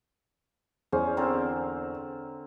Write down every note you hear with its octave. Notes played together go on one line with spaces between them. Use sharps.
E2 C#4 C5
D3 C4 A#4